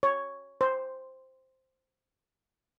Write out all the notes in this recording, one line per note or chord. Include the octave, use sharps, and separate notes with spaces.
C#5
C5